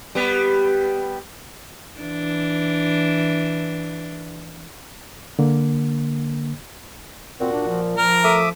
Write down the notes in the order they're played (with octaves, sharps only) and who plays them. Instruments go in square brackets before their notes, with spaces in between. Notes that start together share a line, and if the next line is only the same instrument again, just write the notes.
[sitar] G3 B3
[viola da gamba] E3 D4
[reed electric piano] D3 A#3
[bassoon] A#2 [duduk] C4 [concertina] F#4
[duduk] D4
F3
[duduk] F3 [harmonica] A#4 [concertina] F6
[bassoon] A3 [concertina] E5 D6 D#6